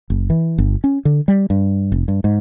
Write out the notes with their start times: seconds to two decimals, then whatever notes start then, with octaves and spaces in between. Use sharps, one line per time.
0.10 F#1
0.30 E3
0.58 G1
0.84 C#4
1.05 D3
1.28 G3
1.50 G2
1.92 F1
2.08 G2
2.24 G#2